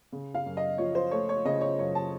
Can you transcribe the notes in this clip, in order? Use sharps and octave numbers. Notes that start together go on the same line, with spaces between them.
C#3
F5
F#2
D#5
F3 C#5
C5
A3 C#5
C#5
C#3 D#5
C#5
F#2 C#5
A5